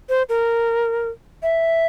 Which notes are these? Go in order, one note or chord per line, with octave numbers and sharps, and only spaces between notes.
C5
A#4
E5